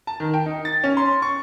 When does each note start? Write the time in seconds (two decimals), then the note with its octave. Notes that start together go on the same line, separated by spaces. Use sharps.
0.07 A5
0.20 D#3
0.34 G5
0.46 D#4
0.65 A6
0.84 C#4
0.97 C6
1.22 C#6